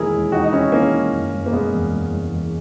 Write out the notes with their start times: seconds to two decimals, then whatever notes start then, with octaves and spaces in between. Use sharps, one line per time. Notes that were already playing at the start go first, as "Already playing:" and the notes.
Already playing: E1 D#2 D#3 E4 G#4 A#4
0.13 E1
0.32 E1 D#4 F#4
0.44 D#4
0.52 D#3 C#4 E4
0.72 D#3 A#3 C#4
0.93 D#3
1.12 F#1
1.33 F#1
1.46 A#3
1.52 B2 G#3 B3
1.73 E2
1.92 F#1
2.12 F#1
2.32 E2